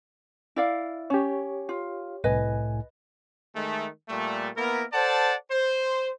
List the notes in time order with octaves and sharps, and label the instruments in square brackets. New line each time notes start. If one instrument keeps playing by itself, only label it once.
[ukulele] E4 D5 F5
[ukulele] C#4 [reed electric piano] G4 C#5
[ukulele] F4
[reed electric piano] C2 G#5 [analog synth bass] A2 [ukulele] B4 D#5
[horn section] D#3 G#3 A3
A#2 G3 A3
A#3 B3 E4 A#4
A4 C5 D5 F#5 A5
C5